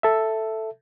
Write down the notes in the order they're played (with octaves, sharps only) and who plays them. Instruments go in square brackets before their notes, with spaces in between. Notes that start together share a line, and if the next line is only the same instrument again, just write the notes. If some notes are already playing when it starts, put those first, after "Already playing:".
[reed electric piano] A4 E5